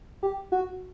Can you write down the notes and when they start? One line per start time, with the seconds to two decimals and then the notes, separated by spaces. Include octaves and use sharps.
0.23 G4
0.52 F#4